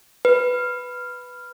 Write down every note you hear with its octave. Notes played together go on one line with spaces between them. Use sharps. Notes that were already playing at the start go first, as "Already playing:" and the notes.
B4